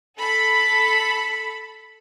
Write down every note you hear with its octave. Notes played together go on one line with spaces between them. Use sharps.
A4 B5